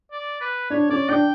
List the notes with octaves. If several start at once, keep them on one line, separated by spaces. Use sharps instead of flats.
D5
B4
D4 C#5
C#4 D5
D4 G5